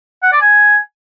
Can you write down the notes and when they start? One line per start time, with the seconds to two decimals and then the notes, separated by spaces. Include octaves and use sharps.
0.23 F#5
0.32 D5
0.41 G#5